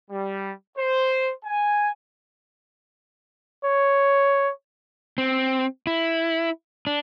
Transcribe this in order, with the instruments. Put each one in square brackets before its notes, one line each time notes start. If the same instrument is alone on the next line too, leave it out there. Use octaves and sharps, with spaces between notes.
[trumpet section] G3
C5
G#5
[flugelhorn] C#5
[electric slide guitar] C4
E4
D4